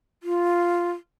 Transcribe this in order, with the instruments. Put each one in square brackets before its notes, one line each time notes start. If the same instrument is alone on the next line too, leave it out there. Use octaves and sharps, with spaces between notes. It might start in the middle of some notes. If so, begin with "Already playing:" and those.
[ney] F4